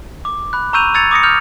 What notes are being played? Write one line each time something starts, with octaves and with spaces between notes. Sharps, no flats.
D6
B5 F#6
A#5 C#6 E6 G6 D#7 F7
E6 G#6 A6 C#7 F7
D6 D#6 A#6 C#7
F6 G6 C#7 F7